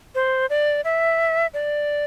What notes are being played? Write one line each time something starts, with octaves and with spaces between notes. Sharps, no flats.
C5
D5
E5
D5